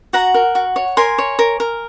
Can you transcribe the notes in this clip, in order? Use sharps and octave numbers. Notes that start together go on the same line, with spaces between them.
F#4 F#5 A#5
A#4
F#4
C#5
A#4 G#5 C6
C#5
A#4
A#4